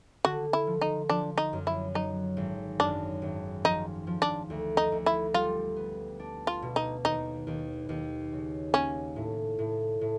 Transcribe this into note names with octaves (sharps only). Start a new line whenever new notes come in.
D3 F#4
E4
F3
D#4
F3 D4
D#4
F#2
E4
F#3 D#4
G#1
F#2 D4
G#1
F3 D#4
F3
D4
D2
D#4
D2
E4
G3 F4
B3
D4
F4
B2
D#4
D#2 D#4
D#2
D#2
C#3
A#3 C#4
A2
A2
A2